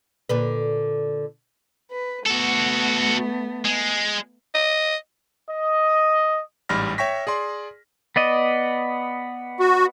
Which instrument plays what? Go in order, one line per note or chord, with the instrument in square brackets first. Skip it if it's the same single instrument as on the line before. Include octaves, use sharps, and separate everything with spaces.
[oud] A#2 D3 B4
[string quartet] B4
[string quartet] A3 B3 [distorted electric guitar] F#4 A4
[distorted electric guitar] G#3
[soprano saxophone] D#5
[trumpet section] D#5
[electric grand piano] A1 G#2 G3 B5 F6 A#6
C#5 E5 G5 C#6 A#6 B6
G#4 D5 C6
[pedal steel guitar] B3 D5 D#5
[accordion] F#4